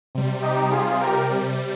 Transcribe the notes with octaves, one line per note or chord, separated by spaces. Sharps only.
C3 G3
D#4 G4
F4 G#4
G4 A#4